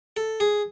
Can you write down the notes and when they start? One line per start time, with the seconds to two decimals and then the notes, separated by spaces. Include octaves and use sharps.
0.17 A4
0.40 G#4